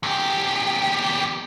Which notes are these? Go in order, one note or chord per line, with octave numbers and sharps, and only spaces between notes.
E2 G4